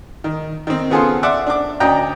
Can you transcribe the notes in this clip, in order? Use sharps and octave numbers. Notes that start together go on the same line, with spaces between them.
D#3
D#3 C4
C#3 B3 F4 G#4 A4 C5
C5 D5 E5 F#5 D6
D4 D6
D2 C#4 D4 D#5 G5 A#5